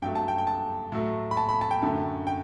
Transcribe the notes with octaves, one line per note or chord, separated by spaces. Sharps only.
G2 F#3 A3 G5
A5
G5
G5
A5
A2 F#3 A3
B5
A5
B5
A5
G5
F#2 D3 A3
G5